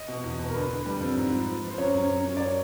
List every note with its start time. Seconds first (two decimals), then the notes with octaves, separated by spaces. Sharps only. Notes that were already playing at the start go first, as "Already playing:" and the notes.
Already playing: D#5
0.08 B2
0.24 E2
0.39 B2
0.50 A#4
0.54 D3 B4
0.71 D3
0.86 G3
1.01 F2
1.17 G#2
1.32 F3
1.48 F3
1.63 F3
1.70 C5
1.78 F#2 C#5
1.95 F#2
2.10 F#2
2.25 F#2
2.36 D5
2.40 C#5